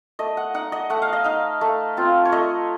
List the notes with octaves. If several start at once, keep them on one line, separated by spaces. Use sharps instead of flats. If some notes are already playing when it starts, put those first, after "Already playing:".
A3 D#5
F#5
D#4 F#5
D#5
A3 F#5
F5
D#5
D#4 F5
A3
C4 F4
C#5
A3 D#5